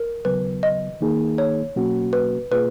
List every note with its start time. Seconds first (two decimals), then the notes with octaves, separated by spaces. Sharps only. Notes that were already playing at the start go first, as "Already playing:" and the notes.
Already playing: A#4
0.25 D#2 C#3 F#3 B3 B4
0.63 D#5
1.01 D#3 A#3 D#4 G#4
1.38 C#5
1.76 B2 F#3 A#3 C#4 F#4
2.13 B4
2.51 B2 A#3 F4 G#4 B4